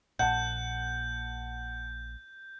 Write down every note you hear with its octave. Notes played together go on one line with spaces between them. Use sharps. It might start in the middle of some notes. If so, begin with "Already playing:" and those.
A#1 A#2 F#5 A5 G6